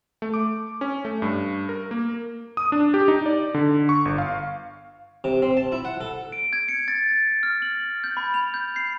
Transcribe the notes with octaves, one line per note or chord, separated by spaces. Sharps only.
A3
D6
C#4
A3
G2
A#4
A#3
D#6
D4
G4
D#4
D5
D3
C#6
G1
F5
C3
C4
A5
E4
F#5
A4
D7
G#6
C#7
A6
A#6
F6
F#7
G6
B5
F7
G6
C7